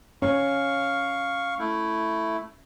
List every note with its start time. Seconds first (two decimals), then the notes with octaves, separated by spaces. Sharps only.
0.22 C#4 C#5 F5 C#6
1.59 A3 E4